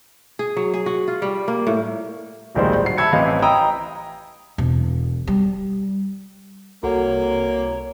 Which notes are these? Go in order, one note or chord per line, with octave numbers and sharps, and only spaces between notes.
G#4
F#3
G#4
F#4
F4
G3
A#3
A2
D1 A#1 D#3 G3 G#3 C5
F#4 C7
E5 A5 B5 E6 G#6 C#7
A1 E3 C4 E4 D#5 F5
D#5 G5 A#5 B5 D#6 E6
E1
G3
C2 A#3 F#4 A4 C#5 F#5